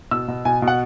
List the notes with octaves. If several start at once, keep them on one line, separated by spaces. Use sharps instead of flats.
B2 E6
B2
B2 G#5
B2
F#5